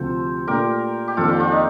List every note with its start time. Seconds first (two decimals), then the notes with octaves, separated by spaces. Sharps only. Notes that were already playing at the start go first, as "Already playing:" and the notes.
Already playing: D2 C3 F3 A4 C5
0.47 A#2 A3 D4 G4 A#4
1.08 G4
1.17 F2 D#3 A#3 F4 A4
1.29 D4 F4
1.40 D4 F4
1.52 D#4